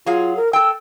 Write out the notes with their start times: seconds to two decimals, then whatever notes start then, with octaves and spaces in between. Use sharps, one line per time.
0.06 F#3 F4 G#4 F5
0.37 A#4
0.53 A4 G5 E6